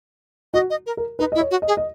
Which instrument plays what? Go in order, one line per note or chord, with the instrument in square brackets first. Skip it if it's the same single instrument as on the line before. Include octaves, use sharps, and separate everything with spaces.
[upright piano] F#4 [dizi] D#5
[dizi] D#5
A#4
[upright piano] A#4
[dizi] D#4 [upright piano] B4
[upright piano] D#5
[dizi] E4
[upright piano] C#5
[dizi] F#4
[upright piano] D#5
[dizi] G#4
[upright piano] D#5